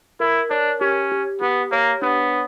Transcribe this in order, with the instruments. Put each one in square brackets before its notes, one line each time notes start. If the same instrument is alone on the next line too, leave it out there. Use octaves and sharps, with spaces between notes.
[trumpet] E4 [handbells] A#4
[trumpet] D4 [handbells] C#5
[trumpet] C#4 [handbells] G4
[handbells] G4
[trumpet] B3 [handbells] G4
[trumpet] A#3 [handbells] C#5
[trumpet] B3 [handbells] D4